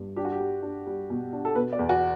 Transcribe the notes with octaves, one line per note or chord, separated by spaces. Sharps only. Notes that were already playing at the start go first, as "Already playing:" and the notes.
Already playing: G2
D4 G4
F#4
G4
G3
D4
G3
B2
D4
A4
B2 B4
D5
E2
F#4